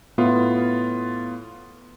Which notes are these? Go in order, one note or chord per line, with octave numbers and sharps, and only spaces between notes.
A2 B3 F4